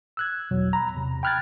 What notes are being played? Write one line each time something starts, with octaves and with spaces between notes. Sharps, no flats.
E6 F#6 G#6
G#1 E2 B2 F#3
A#5 B5
E2 C3
G5 B5 F6 F#6 G#6 A6